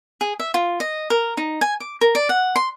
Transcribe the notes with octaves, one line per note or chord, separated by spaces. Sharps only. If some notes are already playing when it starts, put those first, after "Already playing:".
G#4
E5
F4
D#5
A#4
D#4
G#5
D6
A#4
D5
F#5
C6